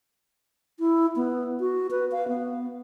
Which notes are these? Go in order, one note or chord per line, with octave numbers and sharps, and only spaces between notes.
E4
B3
F#4
B4
F5
B3